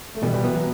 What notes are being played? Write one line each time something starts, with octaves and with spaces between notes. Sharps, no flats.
A3
B2 E3 G3
E3 G3
F#3
E3 B3
F#3